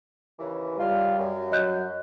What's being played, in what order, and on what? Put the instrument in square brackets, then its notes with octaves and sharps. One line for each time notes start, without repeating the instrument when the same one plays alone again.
[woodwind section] D#2 C#3 E3
[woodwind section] C#2 F4 [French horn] G3
[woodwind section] F#2
[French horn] F#3 [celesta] D#5 F#6 G6